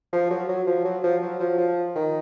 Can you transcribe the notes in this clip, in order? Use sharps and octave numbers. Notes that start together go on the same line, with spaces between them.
F3
F#3
F#3
F3
F#3
F3
F#3
F3
F3
D#3